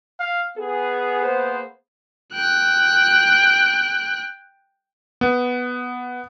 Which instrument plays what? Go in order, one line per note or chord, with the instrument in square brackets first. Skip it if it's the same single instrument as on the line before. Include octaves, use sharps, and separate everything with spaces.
[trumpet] F5
[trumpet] B3 [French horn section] G#4
[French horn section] A#3 G#4 C5
[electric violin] G5 F#6
[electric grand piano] B3